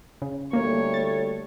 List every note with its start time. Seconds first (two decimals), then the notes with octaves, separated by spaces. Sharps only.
0.22 C#3
0.53 D2 G3 A3 A#3 C#5
0.94 A6